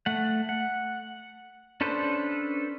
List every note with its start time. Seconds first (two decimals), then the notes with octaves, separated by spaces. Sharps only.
0.06 A3 F#5
0.49 F#5
1.81 C#4 D4 A4 B4 C5